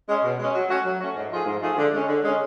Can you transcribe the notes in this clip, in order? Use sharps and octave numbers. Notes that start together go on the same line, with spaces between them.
G#3 C#4
B2
G#3 C#4
F#3
A3 C#4 F#4
F#3
A3 C#4 F#4
G#2
F3 A3 F4 G#4
G#2
F3 A3 F4 G#4
D3
G#3 C#4
D3
G#3 C#4